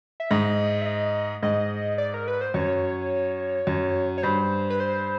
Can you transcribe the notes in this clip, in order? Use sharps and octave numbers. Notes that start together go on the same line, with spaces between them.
E5
G#2 D#5
E5
D#5
G#2 D#5
D5
A#4
B4
C5
F#2 C#5
F#2
C#5
G2 C5
B4
C5